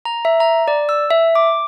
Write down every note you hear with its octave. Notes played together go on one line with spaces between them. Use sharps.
A#5
E5
A#5
D5
E6
E5
D6